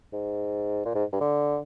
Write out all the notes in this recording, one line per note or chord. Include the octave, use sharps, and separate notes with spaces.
G#2
A#2
G#2
G2
D3